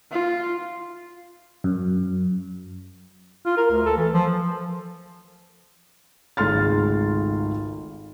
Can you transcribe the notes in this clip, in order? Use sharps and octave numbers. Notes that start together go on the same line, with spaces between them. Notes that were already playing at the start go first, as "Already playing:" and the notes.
F4
F#2
F4
A#4
D2
A4
E3
F3
G#1 C#2 A3 C6 F6 A6